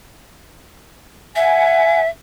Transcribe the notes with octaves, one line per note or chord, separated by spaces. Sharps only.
E5 F#5 G#5